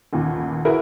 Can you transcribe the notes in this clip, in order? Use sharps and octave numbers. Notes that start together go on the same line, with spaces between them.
A1 D#2 A#2
E4 F#4 G#4 A#4 B4